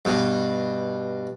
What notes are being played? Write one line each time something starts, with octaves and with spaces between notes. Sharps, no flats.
G2 B2